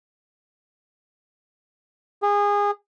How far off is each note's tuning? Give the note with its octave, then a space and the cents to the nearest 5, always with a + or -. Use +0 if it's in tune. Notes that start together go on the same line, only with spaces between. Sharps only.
G#4 -25